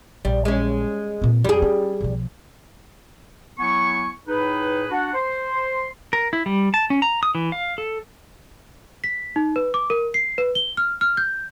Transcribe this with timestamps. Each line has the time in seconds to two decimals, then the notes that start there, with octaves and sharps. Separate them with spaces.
0.25 A#1 G3
0.45 G#3 C#4
1.22 A#2 C4
1.45 F2 G3 G#4
1.62 C#4
2.01 B1 F3
3.59 F#3 B3 E4 G#5 C#6
4.28 A2 D#4 G#4 B4
4.90 D4 F#4 F#5
5.14 C5 C6
6.13 A#4
6.33 E4
6.46 G3
6.74 A5
6.90 C#4
7.02 A#5
7.23 D#6
7.35 E3
7.52 F5
7.78 A4
9.04 B6
9.36 D#4
9.56 B4
9.74 D6
9.90 A#4
10.14 C7
10.38 B4
10.55 G7
10.77 F6
11.01 F6
11.17 G6